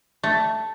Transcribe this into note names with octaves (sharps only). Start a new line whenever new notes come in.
A3